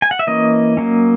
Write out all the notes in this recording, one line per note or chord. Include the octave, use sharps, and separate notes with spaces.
G#5
F#5
E5
E3 A#3 C#4 D#5
F#3 A#3 C#4